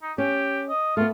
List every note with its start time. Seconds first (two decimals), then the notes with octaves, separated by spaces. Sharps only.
0.02 D#4
0.18 C#4 G4
0.69 D#5
0.97 A3 B3 F4